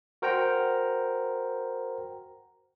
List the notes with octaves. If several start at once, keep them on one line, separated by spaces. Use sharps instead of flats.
F#4 A#4 C5 F#5 G5 A#5